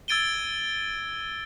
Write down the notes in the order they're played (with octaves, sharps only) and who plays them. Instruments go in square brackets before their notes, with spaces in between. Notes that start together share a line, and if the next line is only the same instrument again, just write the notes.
[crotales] E6 G#6 A6 D7 D#7 G7